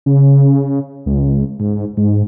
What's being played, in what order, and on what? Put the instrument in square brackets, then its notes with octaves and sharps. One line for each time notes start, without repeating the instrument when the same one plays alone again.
[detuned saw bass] C#3
C#2
G#2
G#2